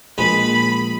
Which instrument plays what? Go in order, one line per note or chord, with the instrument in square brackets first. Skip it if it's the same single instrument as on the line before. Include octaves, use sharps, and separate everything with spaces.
[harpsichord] A#1 G#3 B4 [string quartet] B5